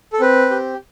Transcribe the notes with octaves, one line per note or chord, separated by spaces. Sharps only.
A4
C4 B4
G4